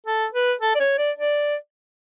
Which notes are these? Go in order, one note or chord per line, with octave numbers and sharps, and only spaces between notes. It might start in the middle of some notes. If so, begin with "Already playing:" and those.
A4
B4
A4
D5
C#5
D5
D5